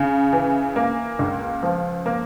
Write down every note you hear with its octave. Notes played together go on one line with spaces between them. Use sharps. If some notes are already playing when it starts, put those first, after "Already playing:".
Already playing: C#3
E3
A#3
C#2
F3
A#3